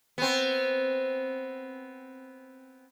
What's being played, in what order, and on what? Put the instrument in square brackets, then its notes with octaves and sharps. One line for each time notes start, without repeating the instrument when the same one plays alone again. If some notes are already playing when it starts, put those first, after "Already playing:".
[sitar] B3 C4